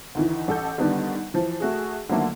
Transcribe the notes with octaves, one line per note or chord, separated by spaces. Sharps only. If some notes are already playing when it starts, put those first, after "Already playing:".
D2 D#3 E3
A1 A4 G6
D3 D#3 G3 B3 D4
E3 F3
A3 F#4 G#4
D3 D#3 F3 F#3 A3 A#3